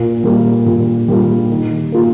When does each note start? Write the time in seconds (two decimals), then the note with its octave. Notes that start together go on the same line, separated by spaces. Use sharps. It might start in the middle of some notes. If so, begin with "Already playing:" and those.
Already playing: A#2
0.24 G3 A#3 F4
0.66 A#2
1.08 G3 A#3 F4
1.50 D#3
1.92 A#3 F4